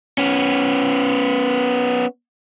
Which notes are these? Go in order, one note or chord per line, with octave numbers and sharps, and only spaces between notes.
B3 C#4